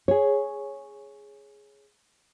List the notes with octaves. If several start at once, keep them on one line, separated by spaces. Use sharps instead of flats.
G#4 C#5